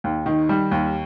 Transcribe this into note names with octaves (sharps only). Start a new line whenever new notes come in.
D#2
D#3
G3
D#2